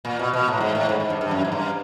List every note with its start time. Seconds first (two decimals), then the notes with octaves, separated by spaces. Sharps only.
0.05 A#2
0.19 B2
0.34 B2
0.48 A2
0.60 G#2
0.75 A2
0.89 G#2
1.00 G#2
1.10 G2
1.21 G2
1.31 F#2
1.45 G#2
1.52 G2